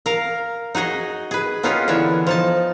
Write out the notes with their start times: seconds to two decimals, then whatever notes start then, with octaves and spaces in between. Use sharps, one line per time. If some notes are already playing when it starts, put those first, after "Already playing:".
0.06 A#4 F5
0.75 D#4 F#4 G#4 D#5
1.31 G#4 B4
1.63 B3 C#4 D#4 F4 G4 G#4
1.88 D3 E3 D4 C#5
2.27 F3 D#4 A5